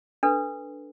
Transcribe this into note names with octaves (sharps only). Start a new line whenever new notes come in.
D4 A4 B4